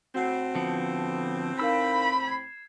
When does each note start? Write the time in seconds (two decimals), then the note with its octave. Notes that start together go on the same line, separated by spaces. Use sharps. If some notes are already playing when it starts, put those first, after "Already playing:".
0.15 A2 C4 F#4 F#5 C7
0.55 D3 F3 B3
1.60 D#4 A#4 F5 B5 E6
2.27 G#6 C7